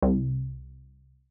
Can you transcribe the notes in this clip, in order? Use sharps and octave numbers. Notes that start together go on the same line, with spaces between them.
C2